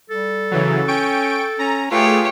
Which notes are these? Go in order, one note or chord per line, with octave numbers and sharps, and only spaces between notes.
G3 A4
C#3 E3 F#3
C#4 G5 C#6 D7
C#4 A#5
A3 F4 G4 G#4 B4 C#5